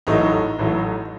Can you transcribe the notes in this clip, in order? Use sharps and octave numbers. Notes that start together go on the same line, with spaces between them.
A1 A2 F#3 A3 D#4
A1 A2 F#3 A3